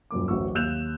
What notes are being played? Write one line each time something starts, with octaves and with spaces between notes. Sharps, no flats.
D#1 F#2 A#3 D6
D1 A1 F#3 C#6 E6
D#2 E6 F#6 G6 E7 F7